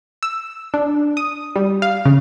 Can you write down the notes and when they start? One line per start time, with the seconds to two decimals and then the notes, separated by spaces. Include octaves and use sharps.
0.23 E6
0.74 D4
1.17 D#6
1.56 G3
1.82 F5
2.05 C#3